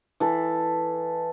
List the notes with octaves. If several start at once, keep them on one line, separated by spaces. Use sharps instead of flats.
E3 A4